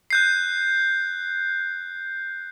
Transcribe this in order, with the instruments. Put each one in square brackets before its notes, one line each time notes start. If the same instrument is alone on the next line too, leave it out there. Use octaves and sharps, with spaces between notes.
[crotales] F#6 G6 C7